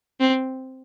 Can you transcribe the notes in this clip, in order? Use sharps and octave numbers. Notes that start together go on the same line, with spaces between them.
C4